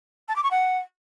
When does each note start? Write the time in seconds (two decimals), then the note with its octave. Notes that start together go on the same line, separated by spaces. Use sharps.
0.28 A5
0.36 D6
0.43 C#6
0.51 F#5